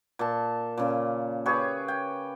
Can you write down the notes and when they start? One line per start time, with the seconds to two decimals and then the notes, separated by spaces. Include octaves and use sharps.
0.19 A#2 A5
0.77 A#2 C#3
1.46 G4 G#4 B4 C#5
1.88 G5